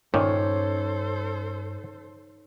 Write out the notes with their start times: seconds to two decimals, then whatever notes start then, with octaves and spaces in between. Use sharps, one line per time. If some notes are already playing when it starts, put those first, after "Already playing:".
0.14 G2 A#2 D#3 C#4 D#4 A4 C5 C#5